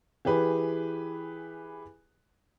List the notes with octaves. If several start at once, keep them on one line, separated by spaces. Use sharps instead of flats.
E3 G4 G#4 B4